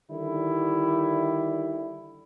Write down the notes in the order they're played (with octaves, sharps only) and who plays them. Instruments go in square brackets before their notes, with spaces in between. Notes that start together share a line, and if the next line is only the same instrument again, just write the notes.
[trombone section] D3 D#3 G3 E4